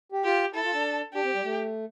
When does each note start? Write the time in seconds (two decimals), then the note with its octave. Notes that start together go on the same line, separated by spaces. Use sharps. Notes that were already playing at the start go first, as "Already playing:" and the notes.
0.12 G4
0.24 F4 G4
0.54 E4 A4
0.64 F4
0.74 D4
1.13 D4 G4
1.24 C4
1.34 G3
1.44 A3